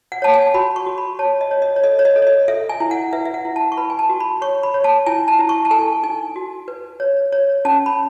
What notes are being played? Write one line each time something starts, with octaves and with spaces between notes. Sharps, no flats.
F#5
C#5 A5
G#5
F#4 B5
C#6
F#4
B5
C#5 A5
D#5
C#5
D#5
C#5
A4 D#5
C#5
D#5
A4
C#5
D#5
A4 E5
G#5
E4
F#5
B4 E5
E5
F#5
E4
A5
C#6
B4 B5
G#5
A5
F#4
B5
C#5 C#6
B5
C#5
A5
E4 G#5
A5
E4
C#6
A5
A4 G#5
D#4 G#5
F#4
B4
C#5
C#5
C#4 A5
B5